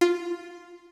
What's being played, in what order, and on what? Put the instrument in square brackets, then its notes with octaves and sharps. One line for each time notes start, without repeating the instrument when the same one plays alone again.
[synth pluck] F4